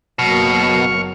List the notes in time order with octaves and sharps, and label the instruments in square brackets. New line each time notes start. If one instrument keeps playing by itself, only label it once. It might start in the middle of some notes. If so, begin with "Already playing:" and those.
[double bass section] F#1 F#3 A#3 [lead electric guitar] B2 [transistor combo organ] C#6 F6